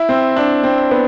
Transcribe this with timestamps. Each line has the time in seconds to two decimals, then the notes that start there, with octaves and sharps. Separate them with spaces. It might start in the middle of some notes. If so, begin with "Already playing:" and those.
Already playing: E4
0.09 C4
0.36 D4
0.64 C4
0.91 B3